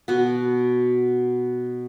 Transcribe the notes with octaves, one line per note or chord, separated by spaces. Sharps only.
B2 B3